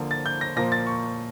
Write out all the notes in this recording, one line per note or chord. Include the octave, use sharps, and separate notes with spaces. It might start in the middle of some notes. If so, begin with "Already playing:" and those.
Already playing: D3 F3 A#3
A6
G6
A#6
A#2 F3 A#3 A#6
A6
C#6